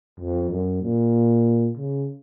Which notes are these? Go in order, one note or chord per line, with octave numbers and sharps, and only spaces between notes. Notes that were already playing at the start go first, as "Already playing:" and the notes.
F2
F#2
A#2
C#3